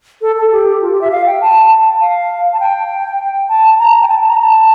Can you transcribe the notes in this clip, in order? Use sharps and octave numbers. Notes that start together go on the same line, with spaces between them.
A4
A4
G4
F4
G4
E5
F5
G5
A5
A5
F5
A5
G5
A5
A#5
G5
A5
A#5
A5